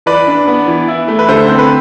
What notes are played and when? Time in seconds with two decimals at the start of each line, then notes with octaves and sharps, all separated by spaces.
0.06 E3 B4 D5
0.27 D4
0.47 B3
0.68 E3
0.88 E4
1.08 A3
1.19 B4
1.29 D3 A4 C5
1.49 C4
1.59 B4